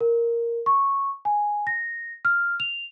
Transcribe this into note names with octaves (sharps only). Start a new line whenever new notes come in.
A#4
C#6
G#5
A#6
F6
F7